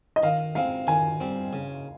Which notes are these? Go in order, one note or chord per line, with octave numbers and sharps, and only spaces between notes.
D#5
D#3 F5
G#3 C4 F5
D#3 G#5
G3 C4
C#3